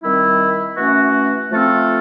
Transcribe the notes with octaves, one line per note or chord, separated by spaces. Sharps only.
D#3 G3 C4 E4
E3 A3 C#4 F#4
F3 A3 C4 F4 A4